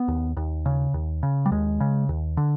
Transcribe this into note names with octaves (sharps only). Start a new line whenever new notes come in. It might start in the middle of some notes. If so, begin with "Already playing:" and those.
Already playing: B3
D#2
D#2
C#3
D#2
C#3
G3
D#2 G#3
C#3
D#2
D3